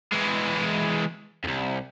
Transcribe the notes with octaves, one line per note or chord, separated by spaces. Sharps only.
E3 G#3
C2 F2